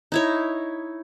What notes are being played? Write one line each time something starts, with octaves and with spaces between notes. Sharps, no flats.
D#4 E4 C#5